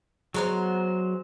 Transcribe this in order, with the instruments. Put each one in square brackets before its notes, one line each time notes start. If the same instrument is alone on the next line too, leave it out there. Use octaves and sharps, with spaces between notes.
[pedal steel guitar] F#3 A#5 [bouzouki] G#3 B3 C5